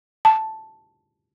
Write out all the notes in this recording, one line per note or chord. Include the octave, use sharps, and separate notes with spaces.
A5